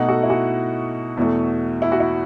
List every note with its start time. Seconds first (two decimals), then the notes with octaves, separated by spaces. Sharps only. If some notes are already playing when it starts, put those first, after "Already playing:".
Already playing: B2 A3 D#4 D#5 F#5
0.08 F#4 A4
0.23 E4
0.30 F#4
1.17 E2 B2 A3
1.82 E4
1.92 F#4
2.00 E4